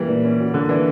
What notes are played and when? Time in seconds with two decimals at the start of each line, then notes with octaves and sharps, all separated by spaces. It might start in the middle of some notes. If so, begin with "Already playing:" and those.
Already playing: E3 G3 A#3
0.08 A#2
0.24 C#4
0.40 F#4
0.54 D3 A#3
0.69 E3 D4